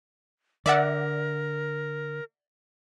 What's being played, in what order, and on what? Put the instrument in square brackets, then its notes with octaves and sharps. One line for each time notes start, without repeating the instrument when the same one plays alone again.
[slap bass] D3 [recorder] A#4 [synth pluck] D5 E5 F#5